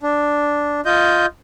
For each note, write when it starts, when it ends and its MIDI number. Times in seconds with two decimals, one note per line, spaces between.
0.03 0.81 62
0.86 1.26 65
0.86 1.26 75
0.86 1.26 91